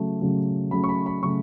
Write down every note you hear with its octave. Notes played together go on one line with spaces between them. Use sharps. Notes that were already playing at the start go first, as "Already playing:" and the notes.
Already playing: C#3 F#3 A3
C#3 F#3 A3
C#3 F#3 A3 B5
C#6
B5
B5
C#3 F#3 A3 C#6